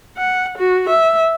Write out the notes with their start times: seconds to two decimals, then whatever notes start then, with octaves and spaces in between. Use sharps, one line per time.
0.17 F#5
0.58 F#4
0.90 E5